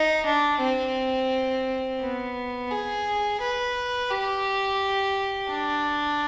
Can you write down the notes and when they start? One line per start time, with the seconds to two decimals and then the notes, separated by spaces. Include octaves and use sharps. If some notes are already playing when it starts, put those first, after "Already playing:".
Already playing: D#4
0.26 D4
0.61 C4
2.01 B3
2.71 G#4
3.41 B4
4.11 G4
5.51 D4